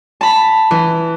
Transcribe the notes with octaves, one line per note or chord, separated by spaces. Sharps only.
A5 B5
E3